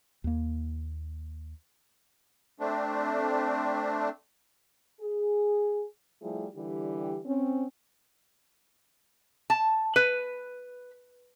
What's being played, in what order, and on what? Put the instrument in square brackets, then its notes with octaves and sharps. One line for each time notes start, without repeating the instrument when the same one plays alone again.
[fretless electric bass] D#2 A#3
[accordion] A3 C4 D4
[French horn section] G#4
F3 G3 A3 E4 G4 G#4
D3 E3 G3 G4
C4 C#4
[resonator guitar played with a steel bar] A5
B4